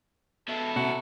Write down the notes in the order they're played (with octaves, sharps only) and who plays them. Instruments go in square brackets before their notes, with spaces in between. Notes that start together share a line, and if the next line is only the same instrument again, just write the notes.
[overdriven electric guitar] B2 E4 [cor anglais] A4
[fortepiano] C3 [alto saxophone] F#4